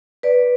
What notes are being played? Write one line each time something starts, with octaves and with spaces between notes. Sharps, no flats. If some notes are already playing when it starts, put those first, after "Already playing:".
B4 D5